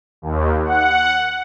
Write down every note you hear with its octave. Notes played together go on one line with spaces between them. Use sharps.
D#2
F#5